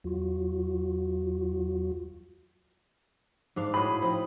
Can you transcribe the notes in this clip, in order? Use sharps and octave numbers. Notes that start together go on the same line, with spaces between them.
E2 F#3 F4 F#4
G#2 D4 F5
A2 F#4 G#4 B5
F3 C4 D#4